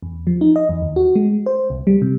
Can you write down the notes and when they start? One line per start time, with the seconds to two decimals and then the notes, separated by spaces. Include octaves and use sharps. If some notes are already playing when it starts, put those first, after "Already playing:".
0.02 E2
0.27 F3
0.41 D#4
0.56 D#5
0.69 E2
0.82 D#2
0.96 F#4
1.15 G#3
1.46 C5
1.70 C2
1.87 G3
2.02 C3